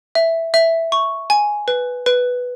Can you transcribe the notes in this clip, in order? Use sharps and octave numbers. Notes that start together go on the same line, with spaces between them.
E5
E5
C#6
G#5
B4
B4